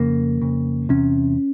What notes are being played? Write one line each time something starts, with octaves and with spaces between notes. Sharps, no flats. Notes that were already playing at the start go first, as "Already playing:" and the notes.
Already playing: F2 C#3 A#3
F2 C#3
E2 C3 C#4